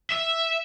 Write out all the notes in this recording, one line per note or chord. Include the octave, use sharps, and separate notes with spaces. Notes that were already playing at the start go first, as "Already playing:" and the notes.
E5